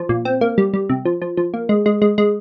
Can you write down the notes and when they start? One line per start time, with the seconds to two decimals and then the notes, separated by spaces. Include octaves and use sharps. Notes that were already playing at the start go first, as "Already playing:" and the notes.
Already playing: F3
0.09 A#2
0.25 C4
0.41 A#3
0.58 G3
0.74 G3
0.89 C3
1.05 F3
1.22 F3
1.37 F3
1.54 A#3
1.69 G#3
1.86 G#3
2.02 G#3
2.18 G#3